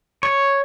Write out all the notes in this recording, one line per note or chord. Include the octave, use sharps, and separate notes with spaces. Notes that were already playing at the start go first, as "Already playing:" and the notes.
C#5